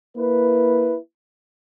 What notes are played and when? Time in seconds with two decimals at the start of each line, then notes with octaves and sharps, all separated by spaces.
0.16 A#3 E4 B4